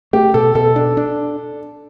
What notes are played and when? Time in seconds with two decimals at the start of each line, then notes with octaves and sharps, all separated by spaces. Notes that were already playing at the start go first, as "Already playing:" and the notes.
0.13 A3 G4
0.34 B2 A4
0.55 B2 A4
0.76 D4
0.97 D4